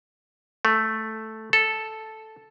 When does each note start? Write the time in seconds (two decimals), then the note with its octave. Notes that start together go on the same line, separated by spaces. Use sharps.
0.65 A3
1.53 A4